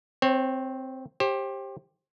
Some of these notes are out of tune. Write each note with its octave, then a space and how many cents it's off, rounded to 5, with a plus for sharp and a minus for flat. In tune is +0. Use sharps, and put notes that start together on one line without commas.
C4 +0 C#5 -30
G4 +5 C5 +35